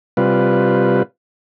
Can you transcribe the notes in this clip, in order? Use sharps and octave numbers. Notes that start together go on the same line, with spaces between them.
C3 G3 F4 B4